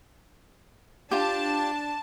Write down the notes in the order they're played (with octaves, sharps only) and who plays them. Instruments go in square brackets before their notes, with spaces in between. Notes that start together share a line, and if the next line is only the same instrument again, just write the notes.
[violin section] D4 A5 [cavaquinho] F4 G4